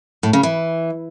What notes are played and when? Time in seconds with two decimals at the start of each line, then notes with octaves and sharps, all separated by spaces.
0.23 A2
0.33 C#3
0.43 E3